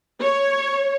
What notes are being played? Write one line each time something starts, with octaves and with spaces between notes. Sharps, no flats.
C#5